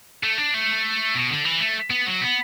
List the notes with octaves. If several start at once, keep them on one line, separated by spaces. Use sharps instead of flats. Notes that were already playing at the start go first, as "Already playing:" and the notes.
A3
D4
A3
B2
D3
E3
A3
B3
F#3
B3